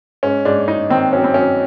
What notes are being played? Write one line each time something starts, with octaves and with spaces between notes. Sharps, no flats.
G#2 C#4
G#2 D4
G#2 D#4
D#3 C4
F#3 C#4
C4
F#3 C#4